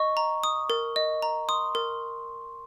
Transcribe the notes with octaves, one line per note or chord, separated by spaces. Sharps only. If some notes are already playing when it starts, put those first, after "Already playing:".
Already playing: D#5 C#6
A#5
D#6
A#4
D#5
A#5
C6 D#6
A#4